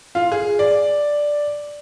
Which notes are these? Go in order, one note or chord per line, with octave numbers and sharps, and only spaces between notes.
F4
G#4
D5